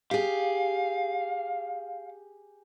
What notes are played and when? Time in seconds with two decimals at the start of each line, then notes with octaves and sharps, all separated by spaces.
0.11 G4 G#4 F5